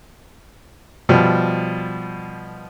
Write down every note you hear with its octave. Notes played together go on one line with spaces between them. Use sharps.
B2 F3 G3